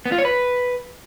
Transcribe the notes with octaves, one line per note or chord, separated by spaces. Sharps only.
B3
F4
C#5
B4